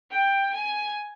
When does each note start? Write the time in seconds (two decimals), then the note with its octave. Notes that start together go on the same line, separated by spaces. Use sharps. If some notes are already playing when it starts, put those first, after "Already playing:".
0.11 G5
0.54 G#5